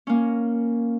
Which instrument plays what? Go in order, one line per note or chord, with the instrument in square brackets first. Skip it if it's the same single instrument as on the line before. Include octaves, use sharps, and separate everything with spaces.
[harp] A#3 C#4